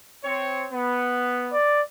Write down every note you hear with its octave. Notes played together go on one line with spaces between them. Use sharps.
C4 C#5
B3
D5